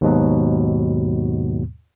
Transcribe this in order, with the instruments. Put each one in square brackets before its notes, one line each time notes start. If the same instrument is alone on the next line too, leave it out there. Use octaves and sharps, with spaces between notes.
[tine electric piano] D#2 G#2 B2 F#3